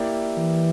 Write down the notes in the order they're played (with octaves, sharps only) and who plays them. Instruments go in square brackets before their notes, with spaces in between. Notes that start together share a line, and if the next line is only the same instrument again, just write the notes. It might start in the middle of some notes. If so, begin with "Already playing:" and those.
Already playing: [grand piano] A#3 E4 G4 D5
[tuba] E3